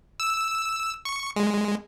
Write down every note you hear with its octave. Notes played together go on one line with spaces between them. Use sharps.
E6
C#6
G#3